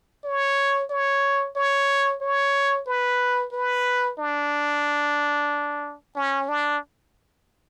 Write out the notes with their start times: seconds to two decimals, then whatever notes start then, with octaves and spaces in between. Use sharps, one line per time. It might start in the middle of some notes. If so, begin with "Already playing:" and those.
0.24 C#5
0.90 C#5
1.56 C#5
2.21 C#5
2.87 B4
3.53 B4
4.19 D4
6.16 C#4
6.48 D4